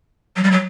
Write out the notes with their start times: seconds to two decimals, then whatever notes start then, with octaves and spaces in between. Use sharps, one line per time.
0.36 F#3
0.44 G3
0.51 F#3